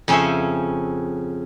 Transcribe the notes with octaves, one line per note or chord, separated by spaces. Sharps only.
F2 C#3 C#4 C5 C#5 E5